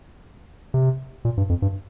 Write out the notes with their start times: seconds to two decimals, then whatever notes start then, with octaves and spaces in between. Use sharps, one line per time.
0.74 C3
1.25 A#2
1.37 G2
1.49 F2
1.62 G2